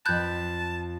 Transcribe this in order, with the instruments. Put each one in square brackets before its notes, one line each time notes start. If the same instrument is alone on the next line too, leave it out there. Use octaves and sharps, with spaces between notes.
[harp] F2 B5 [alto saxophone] A5 [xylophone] F#6 G6